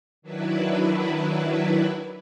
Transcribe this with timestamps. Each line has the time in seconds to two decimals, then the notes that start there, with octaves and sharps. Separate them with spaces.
0.22 D#3 F#3 D4 E4 B4